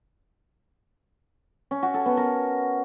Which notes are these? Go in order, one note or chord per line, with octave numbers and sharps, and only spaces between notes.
C#4
F#4
A4
B3
A#4